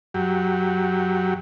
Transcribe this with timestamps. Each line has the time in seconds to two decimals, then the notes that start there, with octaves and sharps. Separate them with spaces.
0.14 F#2 F#3 G4